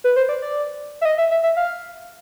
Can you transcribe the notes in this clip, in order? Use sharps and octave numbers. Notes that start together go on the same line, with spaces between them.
B4
C5
D5
D5
E5
D#5
E5
E5
E5
F5